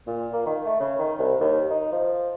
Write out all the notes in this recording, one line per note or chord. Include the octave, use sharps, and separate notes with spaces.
A#2
A#3
D#3
A3
C#3
D#3
C2
D#2
D#4
F3